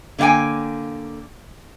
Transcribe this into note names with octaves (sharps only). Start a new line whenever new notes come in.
D3 A#3 D5 G5 G#5